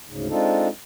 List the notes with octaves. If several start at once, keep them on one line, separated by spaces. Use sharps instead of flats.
D2 G#2 C#3
G#3 C4 D4 D#4 F4 A4